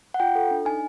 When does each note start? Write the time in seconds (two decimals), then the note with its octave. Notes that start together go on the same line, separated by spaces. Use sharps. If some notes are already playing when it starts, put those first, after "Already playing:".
0.14 F#5
0.20 F4 G5
0.35 A4
0.51 D4
0.65 D#4 G#5